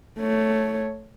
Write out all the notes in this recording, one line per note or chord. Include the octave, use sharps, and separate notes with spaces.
A3 C#5